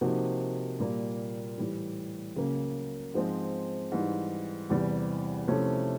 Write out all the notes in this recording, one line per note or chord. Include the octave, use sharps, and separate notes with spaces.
C3 F3 A#3 D#4 F#4
A#2 G3 A#3
A2 E3 G3
C#2 C#3 F#3 A#3
G#2 F3 G#3 C4
G#2 E3 G3
E2 C3 E3 G3
C3 F3 A3 C#4 E4